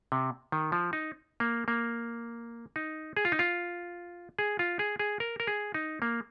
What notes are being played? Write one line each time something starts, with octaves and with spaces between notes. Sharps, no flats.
C3
D#3
F3
D#4
A#3
A#3
D#4
G#4
F4
D#4
F4
G#4
F4
G#4
G#4
A#4
A#4
G#4
D#4
A#3